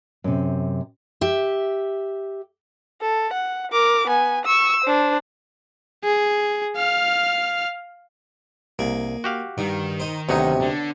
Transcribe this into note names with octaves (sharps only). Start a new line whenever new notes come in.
F#2 C3
G4 E5
A4
F#5
A#4 D6
B3 G#5
C#6 E6
D4 C5
G#4
F5 F6
C2 A#3 G#4
F#4 G4 F5
G2 D#3
D#4 C5
D2 C3 F#3 B3 D#4 C#5
D3